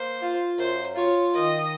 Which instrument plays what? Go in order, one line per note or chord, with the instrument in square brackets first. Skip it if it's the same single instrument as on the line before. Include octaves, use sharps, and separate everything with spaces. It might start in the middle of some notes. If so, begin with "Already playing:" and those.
Already playing: [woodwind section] A#3 [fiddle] C5
[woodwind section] F4
[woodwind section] F#2 [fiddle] C5
[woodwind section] F4 [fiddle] C#5
[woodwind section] D#3 [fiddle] D#5